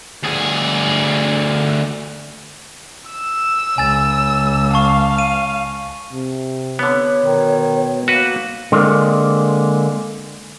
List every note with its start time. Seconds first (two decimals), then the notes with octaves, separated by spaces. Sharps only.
0.24 D2 G#4
3.11 E6
3.78 C#2 G#5 A6
4.74 F5 A5 C#6
5.18 D#7
6.13 C3
6.79 D3 B3 C#5
7.22 B2 D#3
8.08 A#3 F#4 B4
8.72 D3 G#3 A#3 C4